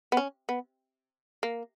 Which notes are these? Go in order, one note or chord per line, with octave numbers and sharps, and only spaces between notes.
B3
C#4
B3
A#3